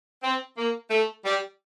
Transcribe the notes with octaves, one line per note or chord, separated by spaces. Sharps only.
C4
A#3
A3
G3